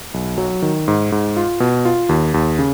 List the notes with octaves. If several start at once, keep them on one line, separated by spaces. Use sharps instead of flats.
B1
F#3
D#3
G#2
G#2
F4
B2
F4
D#2
D#2
C#3